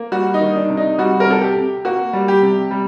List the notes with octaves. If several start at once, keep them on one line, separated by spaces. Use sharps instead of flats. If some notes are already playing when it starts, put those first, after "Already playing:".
Already playing: A#3
G3 F#4
D#4
D#3
D4
C3
D#4
G3 F#4
A#4
C3 A4
G4
C3
A#3 F#4
G3
G4
C3
G3